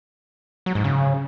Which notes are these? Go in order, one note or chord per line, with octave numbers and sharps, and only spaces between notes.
F#3
G#2
C#3